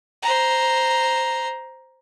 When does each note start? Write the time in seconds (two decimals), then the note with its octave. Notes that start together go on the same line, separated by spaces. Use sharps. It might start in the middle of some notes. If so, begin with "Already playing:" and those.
0.22 C5 A#5